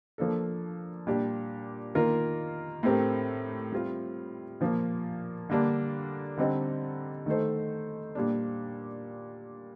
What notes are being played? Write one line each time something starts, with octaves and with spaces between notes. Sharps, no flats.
F3 A#3 D4 A4
A#2 G3 D4 G4
D#3 A#3 F4 A#4
A2 A3 C4 G4 A#4
G3 C4 F4
A#2 F3 A#3
D3 G3 A#3 D4
D3 G3 C4 D#4
D#3 A3 D#4 A4 C5
A#2 G3 D4